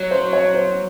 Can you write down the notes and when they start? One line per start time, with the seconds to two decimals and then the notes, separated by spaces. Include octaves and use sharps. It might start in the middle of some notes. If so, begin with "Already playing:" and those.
Already playing: F#3 C#5
0.11 C5
0.33 C#5
0.55 C5